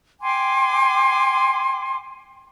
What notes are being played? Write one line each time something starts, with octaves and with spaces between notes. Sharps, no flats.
G5 G#5 C6 D6